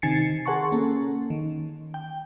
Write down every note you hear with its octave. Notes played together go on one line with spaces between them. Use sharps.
C3 D#3 G#5 A6 C7 C#7
G#4 A#4 F#5 A5 C6 C#6
A#3 C#4 A4
D#3
G5